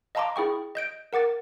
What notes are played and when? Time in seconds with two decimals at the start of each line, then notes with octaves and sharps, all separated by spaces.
0.15 D#5 F5 A5 A#5 C6 D6
0.36 E4 G#4 G5 C#6
0.75 D#5 G6 D7
1.13 A#4 F#5 D6 A6